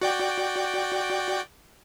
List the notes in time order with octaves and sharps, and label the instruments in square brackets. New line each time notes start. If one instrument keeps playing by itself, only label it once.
[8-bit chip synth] F#4 D5 G5